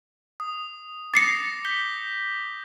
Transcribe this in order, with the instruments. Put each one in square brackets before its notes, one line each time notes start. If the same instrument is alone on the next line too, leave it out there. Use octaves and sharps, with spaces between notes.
[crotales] D#6
[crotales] D6 D#6 A#6 [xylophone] A6 C7 C#7
[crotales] G6 B6 G7